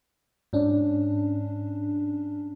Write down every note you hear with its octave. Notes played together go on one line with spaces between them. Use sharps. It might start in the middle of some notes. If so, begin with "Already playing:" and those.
G#2 C#4 D4